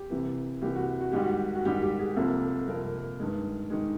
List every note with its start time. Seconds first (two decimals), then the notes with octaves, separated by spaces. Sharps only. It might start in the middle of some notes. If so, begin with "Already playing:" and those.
Already playing: G4
0.10 C2 C3 E3
0.62 C2 C3 E3 G4
0.75 F#4
1.01 F#4
1.12 G#2 D#3 G3 G4
1.22 F#4
1.55 F#4
1.65 G#2 D#3 G3 G4
1.82 G4
1.99 G#4
2.16 C2 C3 F3 A#3 A4
2.42 A4
2.67 C2 C3 F3 A#3 A#4
3.20 G2 D#3 G#3
3.70 D#3 G#3